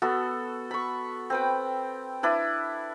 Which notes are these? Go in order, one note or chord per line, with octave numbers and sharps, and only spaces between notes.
B3 F#4 A4
B5 C#6
C4 B4 G5
D4 E4 B4